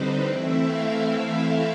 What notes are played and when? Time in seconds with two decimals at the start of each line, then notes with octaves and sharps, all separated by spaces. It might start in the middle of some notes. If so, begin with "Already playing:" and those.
Already playing: D3 G3 C4 D#4 B4 C5
0.24 E3 A3 C4 E4 E5
0.59 F5
0.93 E5